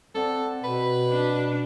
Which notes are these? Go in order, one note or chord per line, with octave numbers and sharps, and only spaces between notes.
C4 A4 D5 F#5
B2 B4
D4